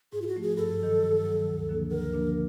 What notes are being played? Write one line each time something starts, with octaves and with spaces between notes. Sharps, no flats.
G#2 G#4
F4
F#4
F3 A3
G#4
G2 A4
D#3 F#3
G2
D#3 F#3
D2
D3 F3 A#3 D4
D2 A#4
D3 F3 A#3 D4